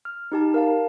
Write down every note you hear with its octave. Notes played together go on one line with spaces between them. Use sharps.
F6
D#4 G4 A5
A#4 F5 A5